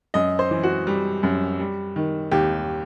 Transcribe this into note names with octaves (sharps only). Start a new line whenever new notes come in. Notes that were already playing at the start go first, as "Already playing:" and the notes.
F#2 D#5
C5
E3
F#4
G3
F#2
G3
D#3
D#2 G4